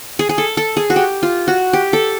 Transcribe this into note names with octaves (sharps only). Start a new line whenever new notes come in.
G#4
G#4
A4
A4
G#4
F#4
G4
F4
F#4
G4
A4